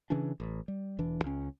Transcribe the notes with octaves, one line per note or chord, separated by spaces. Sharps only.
C#3 E3 C#4 D4
A1
G3
E1 E3 D4
C#2 C#4